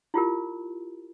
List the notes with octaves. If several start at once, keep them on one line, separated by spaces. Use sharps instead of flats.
E4 F4 G4 A#4